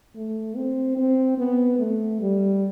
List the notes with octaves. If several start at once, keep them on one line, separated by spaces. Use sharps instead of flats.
A3
C4
C4
B3
A3
G3